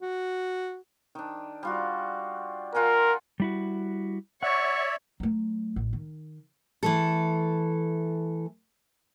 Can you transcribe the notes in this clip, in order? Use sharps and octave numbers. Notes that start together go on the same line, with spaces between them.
F#4
D#3 D4
G3 F4 F#4
F4 A#4 F#5 G#5
G3 E4 F#4
C#5 D5 E5 F#5 C#6
F#3 A3
A1
D#3
E3 A3 A4